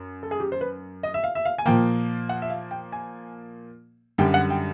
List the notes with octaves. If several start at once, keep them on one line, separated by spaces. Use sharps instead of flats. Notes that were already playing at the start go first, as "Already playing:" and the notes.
Already playing: F#2
A4
G#4
G4
C5
B4
D#5
E5
F5
E5
F5
G#5
A#2 F3 A#3 G5
F#5
E5
F5
G5
G#5
F#2 D3 G3 G5
F#5
G5